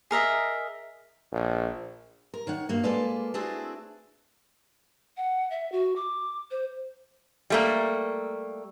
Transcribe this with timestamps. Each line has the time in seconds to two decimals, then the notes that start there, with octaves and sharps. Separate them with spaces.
0.11 G#4 A#4 D#5 E5
1.32 A#1
2.34 A#4
2.47 D#3 C#5 F#5
2.69 G2 A#3 F#4
2.83 G#3 A#3 F4 A4 B4 D5
3.34 A3 C4 D4 E4 F#4 G#4
5.17 F#5
5.50 E5
5.72 F#4
5.96 D6
6.51 C5
7.50 G3 A3 A#3